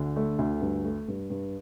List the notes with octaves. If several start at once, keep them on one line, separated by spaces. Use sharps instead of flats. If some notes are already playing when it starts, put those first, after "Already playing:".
Already playing: D2 D3
A3
D2
G2
A3
G2
G2